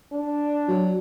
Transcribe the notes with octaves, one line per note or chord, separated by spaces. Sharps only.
D4
F#3